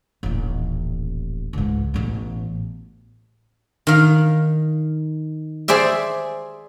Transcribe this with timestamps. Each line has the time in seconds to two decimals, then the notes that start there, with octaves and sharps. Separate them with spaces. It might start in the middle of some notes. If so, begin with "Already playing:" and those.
0.23 D#1 A1
1.53 C#2 G#2
1.94 A1 B2
3.87 D#3 F5
5.68 G#4 C5 D5 E5